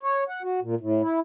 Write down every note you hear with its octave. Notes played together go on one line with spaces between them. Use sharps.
C#5
F#5
F#4
A#2
A2
E4